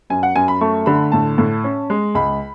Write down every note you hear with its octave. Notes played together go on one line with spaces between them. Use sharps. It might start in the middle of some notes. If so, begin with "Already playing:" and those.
F#2 G#5
F#5
F#2 G#5
B5
A3 C#6
D3 B5
A2 A5
A2
C#4
G#3
C#2 B5